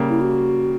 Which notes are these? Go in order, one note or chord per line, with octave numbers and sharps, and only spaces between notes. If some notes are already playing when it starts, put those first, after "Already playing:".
Already playing: C#3 G3 A#3
E4
F#4